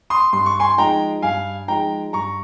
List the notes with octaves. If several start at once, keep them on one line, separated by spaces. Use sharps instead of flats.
C6 D#6
G2 C6
C#6
G#5 C6
F3 G#3 D#4 G5 A#5
G2 F5 G#5
F3 G#3 D#4 G5 A#5
G2 A#5 C#6